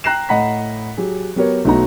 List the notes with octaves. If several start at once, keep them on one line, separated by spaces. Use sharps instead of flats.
G5 A#5 F#6 A#6 C7 E7
A2 D#5 F#5 A#5 B5 B6
F#3 G4 G#4
F#3 B3 G4 A#4 C#5
B1 A3 B3 D#4 F#4 A#5